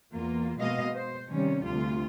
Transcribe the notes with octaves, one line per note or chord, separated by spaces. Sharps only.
E2 A#3 F4
B2 G#3 A#3 D#5 F5
C5
C3 D#3 G3 C#4
D2 C3 F4